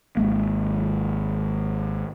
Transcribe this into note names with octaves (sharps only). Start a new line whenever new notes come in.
G#1 G#3 A#3